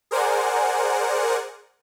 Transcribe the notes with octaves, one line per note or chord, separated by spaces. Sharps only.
G#4 A#4 C5 D5 F#5 G#5